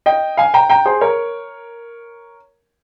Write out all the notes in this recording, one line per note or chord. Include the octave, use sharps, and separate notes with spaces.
D#5 G5
F5 G#5
G5 A#5
G5 A#5
G#4 C5
A#4 C#5